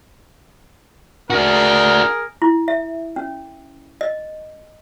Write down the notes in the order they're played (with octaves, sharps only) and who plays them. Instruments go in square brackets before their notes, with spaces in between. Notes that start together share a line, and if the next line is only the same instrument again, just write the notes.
[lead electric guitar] D4 F#4 [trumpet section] G#4 A#4
[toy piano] E4
E5
C#4
D#5